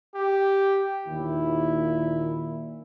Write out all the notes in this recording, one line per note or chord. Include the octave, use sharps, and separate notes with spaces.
G4
D#2 A#2 E4